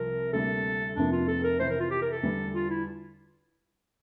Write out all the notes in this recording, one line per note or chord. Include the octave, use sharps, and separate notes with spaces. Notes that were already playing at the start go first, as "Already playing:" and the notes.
Already playing: C2 C3 F3 C4 A#4
D2 C3 G3 A#3 A4
F1 F2 C3 F3 A#3 D4
F4
A4
A#4
F2 C3 E3 C5
A#4
F4
G4
A#4
A4
E2 D3 G3
F4
E4